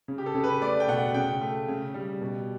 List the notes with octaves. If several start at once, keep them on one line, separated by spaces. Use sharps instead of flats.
C#3
G4
A4
C#3
B4
A3 D5
G5
B2 F#5
C#3 G5
A3
C#3
G3
B2